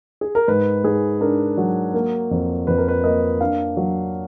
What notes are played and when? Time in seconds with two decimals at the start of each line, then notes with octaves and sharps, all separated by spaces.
0.21 G#4
0.35 A#4
0.48 G#2 B4
0.84 G#2 G#4
1.21 D4 A#4
1.58 F#3
1.94 A#3
2.31 F2
2.67 F2 B4
2.78 A#4
2.88 B4
3.04 A#3 D#5
3.41 D4 F5
3.77 F#3